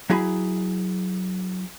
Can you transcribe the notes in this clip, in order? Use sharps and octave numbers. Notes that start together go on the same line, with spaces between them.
F#3 E4 G#4 B5